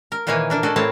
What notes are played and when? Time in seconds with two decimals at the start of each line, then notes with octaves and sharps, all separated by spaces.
0.12 A#4
0.27 A#2 D#3 E3 A#3 C#5 G#5
0.50 A#3 D4 A#4
0.63 F#4 G#4 A4 D5 D#5
0.76 A2 A#3 C4 E4 C#5 A5